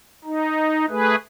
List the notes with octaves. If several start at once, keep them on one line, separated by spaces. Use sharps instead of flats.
D#4
A3 G#4 B4